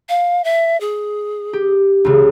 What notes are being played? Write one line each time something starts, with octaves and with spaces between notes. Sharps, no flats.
F5
E5
G#4
G4
C#2 C#3